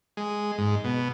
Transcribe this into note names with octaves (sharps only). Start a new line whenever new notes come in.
G#3
G#2
B2